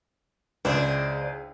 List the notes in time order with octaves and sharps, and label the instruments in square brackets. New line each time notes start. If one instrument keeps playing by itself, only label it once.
[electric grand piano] C#2 [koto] D4 E4 G#4 [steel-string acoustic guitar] C5 D5 D#5